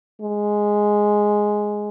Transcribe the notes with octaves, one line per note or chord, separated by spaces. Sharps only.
G#3